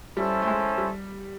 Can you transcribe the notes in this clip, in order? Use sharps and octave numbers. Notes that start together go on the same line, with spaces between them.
G3 C#4 E4 A4 C5
A3
G#3
G3